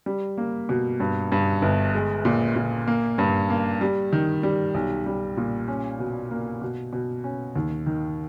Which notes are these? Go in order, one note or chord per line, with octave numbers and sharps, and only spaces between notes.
G3
A#3
B2
G2
G2
G1
G#3
A#2
A#2
A#3
G2
A#3
G3
D#3
G3
B1
G3
A#2
C#4
B2
A#3
B2
B2
C#4
D#2
D#3